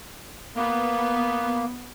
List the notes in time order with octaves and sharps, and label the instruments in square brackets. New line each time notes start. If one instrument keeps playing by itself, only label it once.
[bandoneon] A#3 [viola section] B3